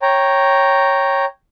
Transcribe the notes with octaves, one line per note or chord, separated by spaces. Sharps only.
C#5 G5 A#5